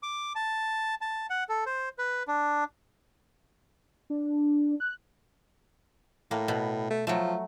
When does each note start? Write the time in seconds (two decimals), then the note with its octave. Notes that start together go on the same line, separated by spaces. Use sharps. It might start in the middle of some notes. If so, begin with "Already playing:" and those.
0.03 D6
0.35 A5
1.01 A5
1.30 F#5
1.49 A4
1.66 C5
1.99 B4
2.28 D4
4.10 D4
4.80 F#6
6.31 A2 A#3
6.48 B2
6.90 A3
7.07 F3 F#3 A3